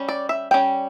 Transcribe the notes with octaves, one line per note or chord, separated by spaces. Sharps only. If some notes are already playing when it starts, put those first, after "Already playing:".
Already playing: G3 C#4
D5
E5
G3 C#4 G5